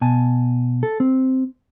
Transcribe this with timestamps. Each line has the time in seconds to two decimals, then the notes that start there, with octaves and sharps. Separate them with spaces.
0.01 B2 G#5 A5
0.83 A4
1.00 C4